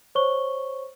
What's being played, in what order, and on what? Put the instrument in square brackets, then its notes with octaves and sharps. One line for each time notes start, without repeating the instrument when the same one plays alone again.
[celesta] C5 C#5 C#6 G7